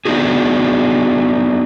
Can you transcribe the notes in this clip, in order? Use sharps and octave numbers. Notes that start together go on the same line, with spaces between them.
B3 D4 D#4 F#4 G#4